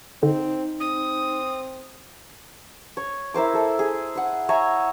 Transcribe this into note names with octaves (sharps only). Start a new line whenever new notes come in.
D3 C4 D#4
C4 D#6
C#5
E4 A#4 C5 D6
A4 E5
G#4
F#5 B5
C#5 E5 G#5 A#5